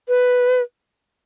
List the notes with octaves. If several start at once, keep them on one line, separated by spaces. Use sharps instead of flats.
B4